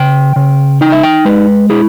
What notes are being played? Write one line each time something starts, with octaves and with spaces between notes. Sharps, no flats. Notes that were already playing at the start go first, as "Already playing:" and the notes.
Already playing: C#3 G5
C#3
D#4 G5
E5
G5
G#3 B4
E4 G#4